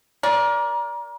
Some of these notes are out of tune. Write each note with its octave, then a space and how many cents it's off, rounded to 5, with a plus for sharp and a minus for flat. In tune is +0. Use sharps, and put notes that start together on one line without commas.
A#4 +25 D5 -15